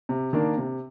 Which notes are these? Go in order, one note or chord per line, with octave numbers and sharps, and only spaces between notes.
C3
D#3 A#3 D4
C3